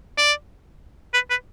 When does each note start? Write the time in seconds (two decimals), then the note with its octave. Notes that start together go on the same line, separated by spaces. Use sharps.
0.18 D5
1.14 B4
1.30 B4